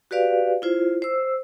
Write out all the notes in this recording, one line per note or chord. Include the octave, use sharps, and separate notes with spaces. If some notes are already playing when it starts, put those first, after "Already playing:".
F#4 G4 B4 D5 F5
E4 F4 C5
C5 E6